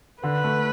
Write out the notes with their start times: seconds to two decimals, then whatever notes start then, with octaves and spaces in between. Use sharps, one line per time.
0.23 D3 B4
0.44 A3